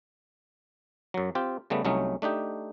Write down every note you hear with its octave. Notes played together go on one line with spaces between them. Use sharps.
F#2 F#3
C4 F4 G4
C#3 G3 A3 B3
C2 F#3 A3 C#4 D#4
A3 D4 D#4 G4